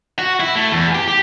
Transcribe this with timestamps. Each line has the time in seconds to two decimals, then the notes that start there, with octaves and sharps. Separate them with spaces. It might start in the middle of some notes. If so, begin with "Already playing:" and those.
0.19 F#4
0.40 E4
0.56 A3
0.71 E2
0.95 G4
1.08 G4